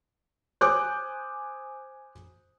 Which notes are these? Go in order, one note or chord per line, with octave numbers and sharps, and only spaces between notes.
C5 G#5 D6 D#6 F#6 G6